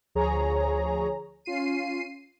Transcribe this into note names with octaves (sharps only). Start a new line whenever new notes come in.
D2 F3 G#4 C#5 A#5
C#4 F4 C7 D#7